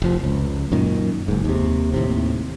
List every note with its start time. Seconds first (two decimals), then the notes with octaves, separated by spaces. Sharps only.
0.02 F1 F3
0.24 C#2
0.72 F#2 A#2 D#3
1.28 F#1 G#2
1.44 D#2 C3
1.94 D#2 A2 C3